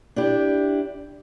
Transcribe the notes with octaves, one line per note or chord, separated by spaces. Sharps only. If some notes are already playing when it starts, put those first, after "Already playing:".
D4 E4 G4